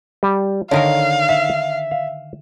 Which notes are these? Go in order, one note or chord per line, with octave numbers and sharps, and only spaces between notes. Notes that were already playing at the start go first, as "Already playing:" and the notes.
G3
D3 D#3 D#4 A#4 C#5 F5
E5
F5